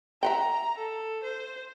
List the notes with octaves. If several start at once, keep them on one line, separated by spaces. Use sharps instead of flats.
E5 F#5 G5 A#5
A4
C5